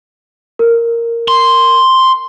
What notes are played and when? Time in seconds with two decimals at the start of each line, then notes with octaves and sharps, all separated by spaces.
0.59 A#4
1.28 C6